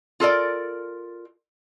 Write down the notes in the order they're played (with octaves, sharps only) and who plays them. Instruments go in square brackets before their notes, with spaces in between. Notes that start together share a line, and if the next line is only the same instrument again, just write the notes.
[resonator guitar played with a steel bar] F4 A4 A#4 D5